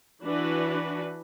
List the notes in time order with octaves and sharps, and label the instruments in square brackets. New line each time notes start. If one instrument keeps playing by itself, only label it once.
[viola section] E3 D4 F#4 B4